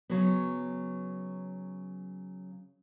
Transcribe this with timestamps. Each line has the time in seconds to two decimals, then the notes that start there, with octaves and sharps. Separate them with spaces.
0.09 C#3 F#3 B3